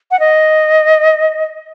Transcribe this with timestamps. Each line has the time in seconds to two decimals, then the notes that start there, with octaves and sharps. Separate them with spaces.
0.11 F#5
0.20 D#5